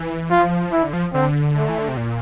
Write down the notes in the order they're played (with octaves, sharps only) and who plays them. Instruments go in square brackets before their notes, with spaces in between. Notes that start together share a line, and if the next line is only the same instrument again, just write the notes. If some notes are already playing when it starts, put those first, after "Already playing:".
Already playing: [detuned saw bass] E3
[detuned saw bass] F3 [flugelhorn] F4
[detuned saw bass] E3 [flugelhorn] E4
[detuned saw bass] D3
F3
[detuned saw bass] D3 [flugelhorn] C4
[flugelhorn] A3
[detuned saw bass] E3
D3
C3
A#2